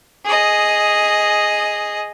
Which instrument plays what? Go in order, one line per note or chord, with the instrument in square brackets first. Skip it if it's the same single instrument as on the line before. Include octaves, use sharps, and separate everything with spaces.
[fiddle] G#4 D#5